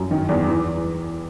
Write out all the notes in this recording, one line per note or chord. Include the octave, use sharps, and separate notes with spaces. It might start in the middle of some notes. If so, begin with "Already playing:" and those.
Already playing: F#2
D#3
E2
E3